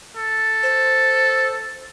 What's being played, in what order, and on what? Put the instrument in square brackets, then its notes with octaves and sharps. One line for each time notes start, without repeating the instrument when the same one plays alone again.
[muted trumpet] A4
[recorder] C5